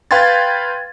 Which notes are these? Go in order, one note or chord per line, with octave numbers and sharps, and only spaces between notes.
B4 F5 G5 C6 G#6 A6